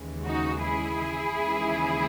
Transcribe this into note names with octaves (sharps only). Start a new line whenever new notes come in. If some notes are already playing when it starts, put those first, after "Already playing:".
Already playing: D#2 C#3 E3 G#3
D#4 F#4
E4 G#4
D#2 C#3 E3 G#3